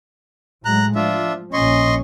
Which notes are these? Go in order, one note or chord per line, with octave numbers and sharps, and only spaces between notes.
A2 F#3 G#3 A#5 F#6
F3 D4 F4 E5
A#1 A#2 C#4 D#5 C6 C#6